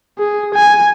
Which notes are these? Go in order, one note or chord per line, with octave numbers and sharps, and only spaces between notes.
G#4
G#5